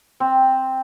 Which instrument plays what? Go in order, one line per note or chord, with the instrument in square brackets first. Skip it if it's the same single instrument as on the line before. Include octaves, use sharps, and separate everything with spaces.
[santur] C4